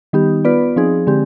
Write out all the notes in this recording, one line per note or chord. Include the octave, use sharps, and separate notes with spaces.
D#3 G3 B3 D#4 G4
B3 F4 B4 D5
F3 C4 D#4 G#4
D3 G#3 C4 G4